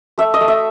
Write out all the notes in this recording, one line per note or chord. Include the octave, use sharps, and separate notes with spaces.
A3 E5
D#5
A3
E5